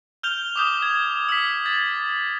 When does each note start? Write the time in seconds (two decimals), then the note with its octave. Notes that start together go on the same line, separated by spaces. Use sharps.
0.23 F6 G6 F7 G7
0.56 D6 D#6 G6
0.82 G#6
1.29 E6 B6
1.66 G#6 A6